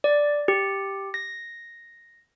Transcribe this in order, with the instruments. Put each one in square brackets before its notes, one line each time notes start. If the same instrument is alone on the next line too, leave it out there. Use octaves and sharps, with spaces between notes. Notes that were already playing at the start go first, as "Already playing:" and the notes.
[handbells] D5
G4
A#6